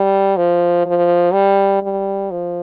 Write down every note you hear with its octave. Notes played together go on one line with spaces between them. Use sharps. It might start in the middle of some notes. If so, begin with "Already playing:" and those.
Already playing: G3
F3
F3
G3
G3
F3